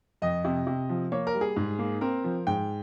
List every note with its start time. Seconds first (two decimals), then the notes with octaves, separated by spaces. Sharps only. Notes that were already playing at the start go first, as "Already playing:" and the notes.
0.22 F2 D#5
0.45 C3
0.67 C3
0.89 F3
1.12 A#3 C#5
1.27 A#4
1.35 G3
1.41 G#4
1.56 G#2
1.79 A#3
2.01 C4 A#4
2.24 F3
2.47 G#2 G5